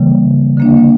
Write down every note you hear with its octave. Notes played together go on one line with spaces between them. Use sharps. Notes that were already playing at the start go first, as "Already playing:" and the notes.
Already playing: C#3 E3 G3 A#3
D3 A#3 D4